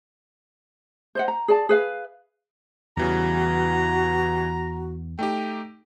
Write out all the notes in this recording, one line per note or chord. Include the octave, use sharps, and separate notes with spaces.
C5 D#5 F#5
A#5
G#4 D5 A5
G#4 B4 F5
E2 C#3 E3 G3 F#4 A#5
A3 D#4 G4 G5